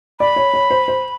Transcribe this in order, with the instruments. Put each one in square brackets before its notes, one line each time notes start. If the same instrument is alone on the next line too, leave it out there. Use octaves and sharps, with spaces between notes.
[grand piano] D5 [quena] B5
[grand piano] C#5
C#5
C5
C5